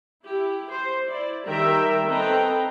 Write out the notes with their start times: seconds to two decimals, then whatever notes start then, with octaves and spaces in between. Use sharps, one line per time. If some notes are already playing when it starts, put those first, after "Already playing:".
0.24 E4 G4
0.71 C5
1.08 E4 D5
1.46 D#3 G3 A#4 E5 G5 A#5
2.07 C4 A4 B4 D#5 G5 A#5